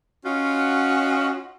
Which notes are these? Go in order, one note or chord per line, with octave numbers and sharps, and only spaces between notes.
C#4 D#4 F4 F#4